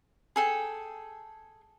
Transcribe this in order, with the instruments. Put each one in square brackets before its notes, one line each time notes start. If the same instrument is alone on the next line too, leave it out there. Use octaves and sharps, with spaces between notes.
[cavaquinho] G#4 A4 G5